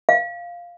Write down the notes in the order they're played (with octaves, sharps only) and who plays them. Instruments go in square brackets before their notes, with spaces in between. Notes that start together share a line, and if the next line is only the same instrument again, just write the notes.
[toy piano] F5